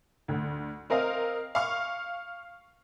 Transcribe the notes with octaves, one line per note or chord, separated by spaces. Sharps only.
D2
C4 A#4 D#5 F5
F5 C#6